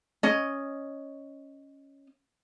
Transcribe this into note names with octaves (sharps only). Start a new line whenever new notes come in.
C#4 D#5